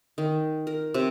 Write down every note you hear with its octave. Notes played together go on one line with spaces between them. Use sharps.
D#3
A#4
C3